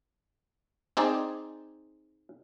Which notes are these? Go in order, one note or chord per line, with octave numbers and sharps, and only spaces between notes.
C4 D#4 G#4 D5